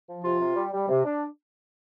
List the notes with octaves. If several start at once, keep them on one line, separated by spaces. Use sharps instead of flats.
F3
C3 F4
C3
G3
G3
C3
D4